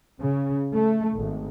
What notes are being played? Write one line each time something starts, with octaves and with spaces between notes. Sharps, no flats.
C#3
A3
G#1